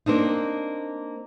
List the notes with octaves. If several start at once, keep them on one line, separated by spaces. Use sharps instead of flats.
A#3 C4 D4 D#4